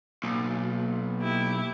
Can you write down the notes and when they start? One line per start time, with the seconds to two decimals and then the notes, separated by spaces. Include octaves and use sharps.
0.24 B1 A#3 G#5
1.21 E4 G4